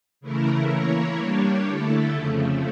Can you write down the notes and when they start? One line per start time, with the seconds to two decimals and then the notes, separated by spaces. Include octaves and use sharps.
0.21 C#3 E3 A3 E4 A#4
0.68 E3 A#3 E4 A#4 C#5
1.16 G3 A#3 D4 G4 C#5
1.64 D3 A3 E4 A4
2.12 F2 C#3 F3 A3